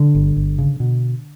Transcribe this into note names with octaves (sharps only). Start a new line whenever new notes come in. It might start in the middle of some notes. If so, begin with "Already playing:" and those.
Already playing: D3
G1
G1
C#3
B2